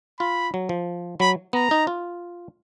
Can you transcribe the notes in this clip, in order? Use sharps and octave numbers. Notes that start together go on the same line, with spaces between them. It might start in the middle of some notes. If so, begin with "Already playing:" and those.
F4 B5
F#3
F3
F#3 B5
B3 A#5
D#4
F4